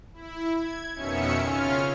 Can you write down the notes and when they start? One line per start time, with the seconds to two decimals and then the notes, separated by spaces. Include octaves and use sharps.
0.14 E4
0.56 G#6
0.95 F2 B2 D#3 C#4 E5 C#7
1.42 C#3 C#4 F4 F6